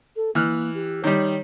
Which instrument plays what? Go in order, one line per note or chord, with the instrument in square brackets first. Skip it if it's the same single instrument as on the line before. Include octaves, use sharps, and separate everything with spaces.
[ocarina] A4
[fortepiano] E3 F6 F#6 [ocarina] A#3
[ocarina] G4
[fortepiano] D#3 G3 [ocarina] C#5